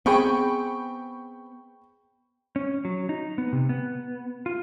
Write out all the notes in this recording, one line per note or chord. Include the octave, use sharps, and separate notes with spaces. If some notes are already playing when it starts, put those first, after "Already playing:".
B3 C4 G#4 G5 B5 C#6
C#4
F#3
D#4
B3
C3
B3
F4